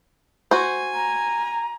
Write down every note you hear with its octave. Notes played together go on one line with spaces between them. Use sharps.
F#4 C5 G#5
A#5